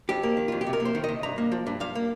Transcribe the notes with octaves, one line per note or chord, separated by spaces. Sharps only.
F2 G4
A#3
D#3
F2 F4
G4
C3
A#4
A#3
C5
D#3
C3 D#5
G2 A#5
A#3
F3
G2
G2 F5
A#3